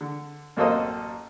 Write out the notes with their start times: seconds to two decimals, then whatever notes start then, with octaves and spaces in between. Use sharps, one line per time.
0.01 D3
0.56 A1 F#2 A#3 A4 C5 D#5